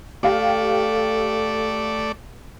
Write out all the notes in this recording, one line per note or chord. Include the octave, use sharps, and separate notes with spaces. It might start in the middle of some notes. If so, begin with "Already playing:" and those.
A3 G4 A4 D5 F5